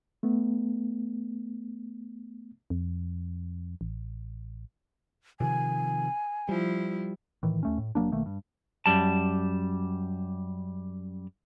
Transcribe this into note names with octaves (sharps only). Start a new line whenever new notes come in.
A3 B3
F2
A1
C3 D#3 F3 G#5
F3 G3 E4
A2 D#3 E3
D#2 A3 C#4
A2
F1 F#3 A#3 D4
B1 D#3 A3 A#3
G2
F#2 G3 A5